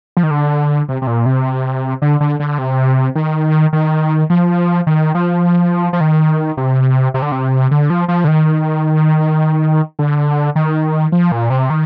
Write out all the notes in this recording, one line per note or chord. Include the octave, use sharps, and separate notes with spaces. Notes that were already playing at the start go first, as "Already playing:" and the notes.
F3
D#3
D3
C3
C3
A#2
C3
D3
D3
D3
C3
D#3
D#3
F3
D#3
F3
F3
D#3
C3
C3
D3
C3
D3
F3
F3
D3
D#3
D3
D#3
F3
A#2
C3
D#3